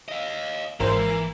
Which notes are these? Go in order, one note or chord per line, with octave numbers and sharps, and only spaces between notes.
D#5 F5
G#1 E3 A#3 C5